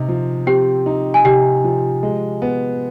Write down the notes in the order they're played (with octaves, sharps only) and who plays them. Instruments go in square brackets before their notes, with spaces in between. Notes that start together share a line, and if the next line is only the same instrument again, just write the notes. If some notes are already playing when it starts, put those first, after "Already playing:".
Already playing: [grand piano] C3 D#4
F3
[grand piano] C4 [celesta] G4 G5
[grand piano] D#4
[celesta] G#5
[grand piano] C3 [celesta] G4 G5
[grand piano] F3
G#3
B3